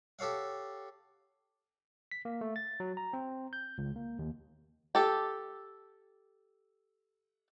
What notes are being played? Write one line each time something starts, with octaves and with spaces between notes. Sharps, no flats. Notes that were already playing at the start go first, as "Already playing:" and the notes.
G4 A4 C#5 F5 F#5
B6
A#3
A3
A6
F#3
A#5
C4
G6
C#2
A#3
D#2
G4 A4